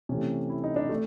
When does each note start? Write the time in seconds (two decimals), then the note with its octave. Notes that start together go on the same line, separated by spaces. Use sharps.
0.09 C3 E3 A3 C#4
0.50 E4
0.64 D#4
0.76 D4
0.89 A3